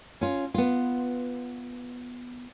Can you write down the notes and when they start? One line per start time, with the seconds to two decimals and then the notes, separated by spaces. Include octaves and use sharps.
0.21 C#4 F4
0.54 B3 F4